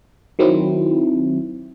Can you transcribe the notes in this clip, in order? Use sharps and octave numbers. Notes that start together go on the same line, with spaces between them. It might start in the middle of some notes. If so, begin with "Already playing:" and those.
D#3 F#3 C4 E4